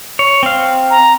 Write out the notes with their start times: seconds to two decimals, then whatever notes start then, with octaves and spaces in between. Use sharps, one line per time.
0.19 C#5
0.43 C4 F5
0.90 A#5